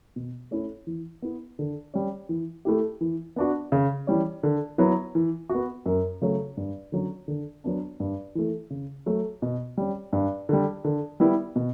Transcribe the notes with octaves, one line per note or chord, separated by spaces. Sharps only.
B2
A3 C#4 E4
E3
B3 E4
D3
G3 C#4
E3
A3 E4 G4
E3
B3 D4 F#4
C#3
E3 G3 C#4
D3
F#3 B3 E4
E3
F#4
B3
F#2
C#3 F#3 A3 C#4
G2
D3 F#3 C#4
D3
F#3 B3 D4
G2
E3 A3
C#3
F#3 A3
B2
G3 C#4
G2
D3 G3
D3
G3 B3 E4
B2